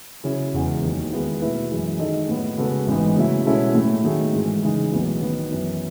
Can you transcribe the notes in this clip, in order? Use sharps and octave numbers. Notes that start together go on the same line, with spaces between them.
C#3 F#3 C#4 E4 G#4
E1 E2 C#3 E3 G#3
D#2 D#3 F#3
D#3 G#3 B3 E4
B2 A3 E4 B4
F#2 E3 G#3
D#3 G#3 D#4 A4 D#5
A2 F#3 B3 F#4
C#3 G#3 B3 F#4 A4
A1 G#2 E3 B3 D#4
C#3 F#3 A3 E4
B2 G#3 C#4 E4 A4
A2 F#3 A3
D#3 F#3 A3 D#4 G#4
G#2 E3 G#3
C#3 E3 G#3 D#4
B1 A2 E3 B3 F#4
D#3 F#3 B3
F#2 E3 B3